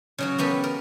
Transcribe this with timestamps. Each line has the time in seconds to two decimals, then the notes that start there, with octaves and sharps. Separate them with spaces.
0.18 C#3 F#3 F#4
0.38 A#3 B3 G4 A4
0.64 A#4